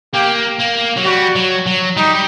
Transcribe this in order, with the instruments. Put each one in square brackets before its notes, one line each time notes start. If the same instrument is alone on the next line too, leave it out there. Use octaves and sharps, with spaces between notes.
[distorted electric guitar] A#3 [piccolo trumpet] G4
[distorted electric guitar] A#3
F#3
[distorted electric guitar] G3 [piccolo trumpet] F#4
[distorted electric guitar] F#3
F#3
[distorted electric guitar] G3 [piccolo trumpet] D#4